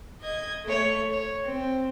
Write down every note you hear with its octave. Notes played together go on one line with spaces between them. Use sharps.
D#5 G#6
A3 C#5
C#5
C4